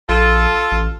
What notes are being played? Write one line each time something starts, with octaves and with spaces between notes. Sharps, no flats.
A#1 F4 A4
A1